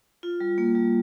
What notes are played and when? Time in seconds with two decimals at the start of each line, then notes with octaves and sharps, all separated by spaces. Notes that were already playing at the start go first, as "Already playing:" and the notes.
0.23 F4
0.40 G3
0.58 A#3
0.75 G3